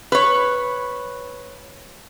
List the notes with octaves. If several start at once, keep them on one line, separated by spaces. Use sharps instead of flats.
B4 C#5